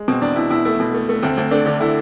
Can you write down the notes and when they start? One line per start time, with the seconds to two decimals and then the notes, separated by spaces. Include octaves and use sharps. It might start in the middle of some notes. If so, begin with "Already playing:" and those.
Already playing: G#3
0.08 B2 C4
0.22 E2 D4
0.36 B2 E4
0.50 B2 E4
0.65 A3 E4
0.80 B2
0.94 A3
1.09 A3
1.22 D2 C4
1.37 D2 C4
1.51 A3 D4
1.66 D3 D4
1.80 D3 E4